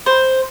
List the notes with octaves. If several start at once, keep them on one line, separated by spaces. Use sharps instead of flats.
C5